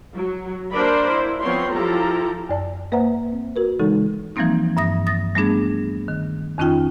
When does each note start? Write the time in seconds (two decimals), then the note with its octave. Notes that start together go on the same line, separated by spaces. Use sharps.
0.16 F#3
0.72 A#3 D4 A#4 C5 D5 B5
1.12 E4
1.42 F3 B3 C4 C#5 C6
1.74 F3 E4 F4 G4 A4 A#5
2.49 F#2 D5 A5
2.92 A#3 B4 C5 E5 F#5 A#5
3.32 C4
3.56 F#4 A#4 B4
3.79 C#3 E3 G#3 D#4 A4
4.36 E3 F3 G3 A#3 C4 D#4
4.77 G2 E5 D#6 A#6
5.07 D#6 A6 A#6
5.35 G3 A3 B3 D4 G#4
6.08 D#3
6.58 F2 D#3 C#4 D#4 F4 G5